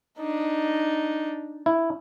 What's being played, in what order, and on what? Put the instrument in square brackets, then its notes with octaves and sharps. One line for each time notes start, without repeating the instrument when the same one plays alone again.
[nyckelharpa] D4 D#4
[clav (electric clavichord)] E4